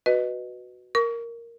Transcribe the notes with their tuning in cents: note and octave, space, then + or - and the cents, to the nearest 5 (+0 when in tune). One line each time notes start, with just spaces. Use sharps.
F#4 +0 B4 +0 D#5 -10
A#4 +0 C#6 +35